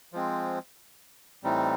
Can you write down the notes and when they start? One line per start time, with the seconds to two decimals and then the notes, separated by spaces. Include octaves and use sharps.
0.13 F3 G#3 C4
1.44 A2 E3 G3 C4 D#4